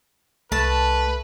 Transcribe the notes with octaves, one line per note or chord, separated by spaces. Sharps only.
C2 A3 B4 A5